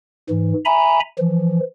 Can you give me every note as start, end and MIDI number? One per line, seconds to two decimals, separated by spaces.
0.29 0.53 44
0.29 0.53 52
0.65 1.00 76
0.65 1.00 80
0.65 1.00 82
0.65 1.00 83
1.18 1.60 52
1.18 1.60 53